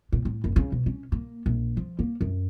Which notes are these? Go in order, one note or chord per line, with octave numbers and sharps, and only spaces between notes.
A#2
A2
F#1
C#3
B2
C#4
A#3
A#1
F3
A#3
F#2